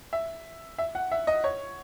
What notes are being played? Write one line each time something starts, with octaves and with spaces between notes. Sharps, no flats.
E5
E5
F#5
E5
D#5
C#5